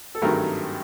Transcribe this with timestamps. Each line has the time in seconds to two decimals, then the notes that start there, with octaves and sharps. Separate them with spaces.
0.15 A4
0.22 G#1 G2 D#3 F#3 A3 A#4